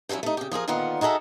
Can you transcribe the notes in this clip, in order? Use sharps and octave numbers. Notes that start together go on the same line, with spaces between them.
G2 F3 F#3 C#4 E4
A3 D#4
C#3 G4
F3 F4 G#4 A#4
A#2 D3 D#3 B3 F4 F#5
D#4 F#4 G#4 A4 E5